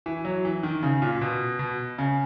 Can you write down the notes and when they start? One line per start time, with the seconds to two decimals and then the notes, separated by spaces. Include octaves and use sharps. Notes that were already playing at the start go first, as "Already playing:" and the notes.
0.06 E3
0.25 F#3
0.45 E3
0.63 D#3
0.83 C#3
1.02 A#2
1.21 B2
1.59 B2
1.98 C#3